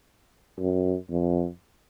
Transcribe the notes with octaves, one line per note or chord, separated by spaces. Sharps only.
F#2
F2